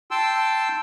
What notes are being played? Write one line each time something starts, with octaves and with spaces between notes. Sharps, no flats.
G5 A5 C6 E6